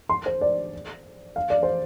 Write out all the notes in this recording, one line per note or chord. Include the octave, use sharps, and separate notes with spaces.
C6
C5
D5
F5
D5
C5